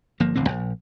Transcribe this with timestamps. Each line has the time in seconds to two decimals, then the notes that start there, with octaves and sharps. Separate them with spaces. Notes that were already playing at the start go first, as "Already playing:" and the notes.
0.20 G1 F3 A#3
0.35 D#1 A1 D3 C4
0.49 A#1